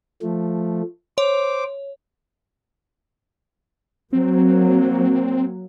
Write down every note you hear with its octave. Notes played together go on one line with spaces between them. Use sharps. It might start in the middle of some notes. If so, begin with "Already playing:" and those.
F3 A3
C5 C#5 D6
F#3 A#3 C4